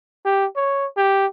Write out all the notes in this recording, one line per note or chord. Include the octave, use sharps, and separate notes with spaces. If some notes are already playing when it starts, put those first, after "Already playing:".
G4
C#5
G4